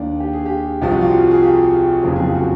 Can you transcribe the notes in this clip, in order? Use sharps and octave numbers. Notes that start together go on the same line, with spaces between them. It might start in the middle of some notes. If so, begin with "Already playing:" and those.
Already playing: D#2 D#3 D4
G4
G#4
G4
C2 C3 F3 G4
F#4
F4
F#4
G#4
G4
F#1 F2 C#3 F3
G#4
G4
F#4